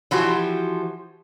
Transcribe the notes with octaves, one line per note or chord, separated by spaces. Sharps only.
E3 F3 F#4 G4